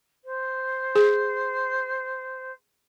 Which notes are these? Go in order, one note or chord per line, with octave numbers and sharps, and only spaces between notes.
C5
G#4